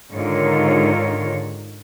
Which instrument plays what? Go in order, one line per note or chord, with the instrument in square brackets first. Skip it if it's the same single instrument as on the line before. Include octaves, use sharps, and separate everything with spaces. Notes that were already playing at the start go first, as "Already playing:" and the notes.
[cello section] G#2 D3 D#3 F4 A#4 C#5